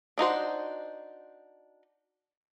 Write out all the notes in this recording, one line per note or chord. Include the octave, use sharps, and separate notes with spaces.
D4 D#4 F#4 C5